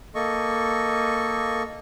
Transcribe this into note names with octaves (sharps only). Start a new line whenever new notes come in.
A#3 A4 D#5 C#6